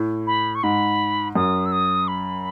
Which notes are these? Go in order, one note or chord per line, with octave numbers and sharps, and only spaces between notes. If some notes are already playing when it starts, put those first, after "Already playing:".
Already playing: A2
B5
C#6
G#2 B5
F#2 D#6
E6
D#6
B5